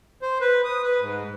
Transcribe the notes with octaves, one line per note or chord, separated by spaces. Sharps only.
C5
B4
D#6
B4
G#2